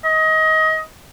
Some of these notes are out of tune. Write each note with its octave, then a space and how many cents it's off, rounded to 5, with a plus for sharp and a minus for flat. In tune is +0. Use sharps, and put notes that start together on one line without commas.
D#5 +25